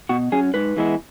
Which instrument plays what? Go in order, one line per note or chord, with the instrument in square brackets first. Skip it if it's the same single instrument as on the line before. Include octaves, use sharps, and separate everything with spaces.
[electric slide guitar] B2 F#4
F#3 C#4 G#4
G#2 B4
E3 G#3 B3 E4